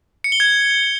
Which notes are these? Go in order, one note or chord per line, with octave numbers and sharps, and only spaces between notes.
C#7
G7
G#6